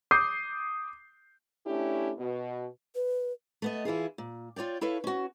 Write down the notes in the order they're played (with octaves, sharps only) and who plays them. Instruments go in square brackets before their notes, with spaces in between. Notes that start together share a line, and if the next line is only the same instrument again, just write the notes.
[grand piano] D6 D#6 G6 C7
[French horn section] A3 C#4 D4 E4 G4
B2
[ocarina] B4
[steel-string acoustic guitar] A3 B3 D#5
E3 E4 F4 G#4
A#2
F4 C#5 D5 G5
E4 A4 B4 C#5 F5
C#4 F#4